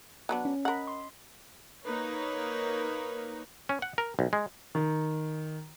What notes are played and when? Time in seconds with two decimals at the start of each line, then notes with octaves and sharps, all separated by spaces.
0.29 F#3 B3 D4
0.45 C#4
0.65 A#4 D#5 F#5 B5
0.87 C6
1.85 A#3 D#4 A#4 B4 C#5
3.69 C#4
3.82 F#5
3.98 A#4
4.19 B1
4.33 G#3
4.75 D#3